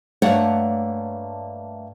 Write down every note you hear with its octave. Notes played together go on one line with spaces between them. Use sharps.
G2 A3 A#3 C#5 D5 F#5